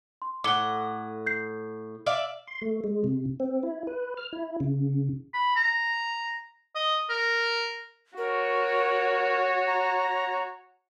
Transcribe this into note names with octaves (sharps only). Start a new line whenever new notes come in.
C6
A2 F#5 D6 C#7 G7
G6 C7
D5 E5 F5
C6
A3
G#3
C3
C4
E4
B4
F6
E4
C#3
B5
A#5
D#5
A#4
F#4 A#4 C#5
A#5